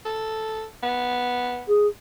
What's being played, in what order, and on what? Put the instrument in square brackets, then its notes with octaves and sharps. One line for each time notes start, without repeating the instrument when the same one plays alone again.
[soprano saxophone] A4
B3
[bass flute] G#4